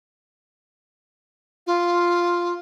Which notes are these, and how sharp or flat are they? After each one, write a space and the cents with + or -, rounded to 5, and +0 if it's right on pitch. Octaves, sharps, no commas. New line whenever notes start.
F4 +0